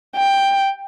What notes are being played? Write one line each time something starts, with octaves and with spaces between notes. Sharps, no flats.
G5